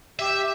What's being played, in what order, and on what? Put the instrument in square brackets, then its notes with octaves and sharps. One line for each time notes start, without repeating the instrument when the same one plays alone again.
[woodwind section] G4 [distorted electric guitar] E5